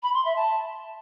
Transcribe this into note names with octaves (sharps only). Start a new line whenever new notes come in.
B5
C6
E5
A5